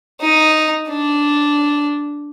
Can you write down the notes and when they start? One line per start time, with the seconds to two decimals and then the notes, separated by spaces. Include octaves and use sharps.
0.21 D#4
0.89 D4